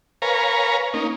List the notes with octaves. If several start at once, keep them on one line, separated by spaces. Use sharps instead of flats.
A#4 B4 C#5 F5 G#5 A#5
A#3 C#4 D#4